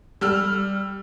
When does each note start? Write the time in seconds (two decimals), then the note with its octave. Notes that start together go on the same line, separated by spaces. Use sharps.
0.21 G3 E6 F6